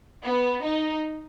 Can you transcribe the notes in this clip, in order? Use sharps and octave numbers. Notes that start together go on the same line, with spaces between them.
B3
D#4